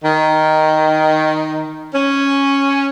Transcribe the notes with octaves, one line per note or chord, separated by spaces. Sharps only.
D#3
C#4